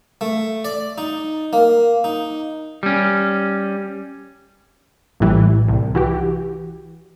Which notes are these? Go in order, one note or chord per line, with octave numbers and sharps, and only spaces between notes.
A3
D5
D#4
A#3
D#4
G3 C#4
A#1 A2 E3 G3
C2
E3 F#4 G4